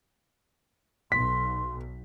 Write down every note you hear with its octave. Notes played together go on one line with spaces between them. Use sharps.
B1 C6 B6